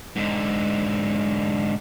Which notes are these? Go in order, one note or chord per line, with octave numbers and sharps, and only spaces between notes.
G#2 D3